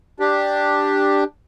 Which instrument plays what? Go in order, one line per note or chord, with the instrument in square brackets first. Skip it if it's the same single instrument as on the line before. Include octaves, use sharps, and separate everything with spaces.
[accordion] D4 G4